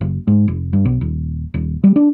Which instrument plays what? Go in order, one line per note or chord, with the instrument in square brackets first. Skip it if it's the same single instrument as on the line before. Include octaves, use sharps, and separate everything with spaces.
[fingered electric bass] F#1
G#2
F1
G2
B1
D#1
D#1
G3
D4